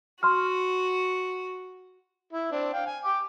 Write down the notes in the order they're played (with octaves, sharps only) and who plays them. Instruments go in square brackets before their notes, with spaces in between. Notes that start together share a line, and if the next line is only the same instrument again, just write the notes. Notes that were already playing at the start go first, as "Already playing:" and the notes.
[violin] F#4 [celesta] C6 F6
[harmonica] E4
C4 D4
F5 G5
G#5
G5 D6